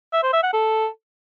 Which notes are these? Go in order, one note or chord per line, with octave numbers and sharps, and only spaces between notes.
E5
C5
E5
F#5
A4